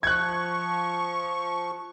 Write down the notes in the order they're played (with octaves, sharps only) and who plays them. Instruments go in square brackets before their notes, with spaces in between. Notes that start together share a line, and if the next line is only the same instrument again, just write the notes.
[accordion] F3 C#6 [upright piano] F#6 G#6